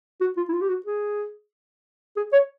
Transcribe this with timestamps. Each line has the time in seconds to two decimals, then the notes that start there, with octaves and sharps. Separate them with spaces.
0.21 F#4
0.37 F4
0.49 E4
0.53 F4
0.61 G4
0.69 F#4
0.86 G#4
2.17 G#4
2.33 C#5